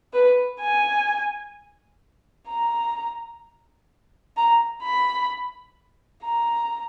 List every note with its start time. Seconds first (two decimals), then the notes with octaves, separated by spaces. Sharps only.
0.14 B4
0.60 G#5
2.49 A#5
4.37 A#5
4.83 B5
6.24 A#5